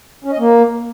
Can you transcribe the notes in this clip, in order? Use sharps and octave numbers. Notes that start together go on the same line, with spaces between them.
C#4
D#5
A#3